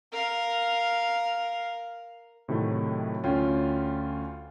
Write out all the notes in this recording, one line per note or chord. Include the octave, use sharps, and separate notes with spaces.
A#4 F5
A2 C3 D#3 F#3 A3
D2 C#4 F4 G5